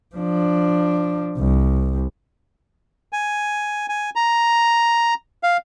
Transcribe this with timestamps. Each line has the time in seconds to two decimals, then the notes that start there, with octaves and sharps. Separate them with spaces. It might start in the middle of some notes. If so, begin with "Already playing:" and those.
0.15 F3 D4
1.38 C2
3.13 G#5
3.89 G#5
4.16 A#5
5.43 F5